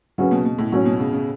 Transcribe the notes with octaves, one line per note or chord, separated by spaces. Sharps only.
C#3 F#3 C#4 F#4 B4
B2
B2
A2
A2 F#3 C#4 F#4 C#5
B2
C#3
C#3